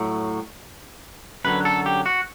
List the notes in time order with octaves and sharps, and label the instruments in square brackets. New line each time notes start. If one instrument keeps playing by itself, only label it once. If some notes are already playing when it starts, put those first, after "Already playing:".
Already playing: [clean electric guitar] A2 F#3
F#2 D3 F#3 B4
A4
G4
F#4